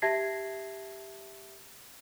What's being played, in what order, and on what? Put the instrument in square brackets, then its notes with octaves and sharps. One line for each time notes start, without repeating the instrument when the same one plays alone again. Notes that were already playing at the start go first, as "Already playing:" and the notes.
[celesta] G4 E5 A5 G#6 A#6 C7